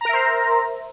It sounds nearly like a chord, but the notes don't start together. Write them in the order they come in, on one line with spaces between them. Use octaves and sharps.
A#5 A#4 E5 C5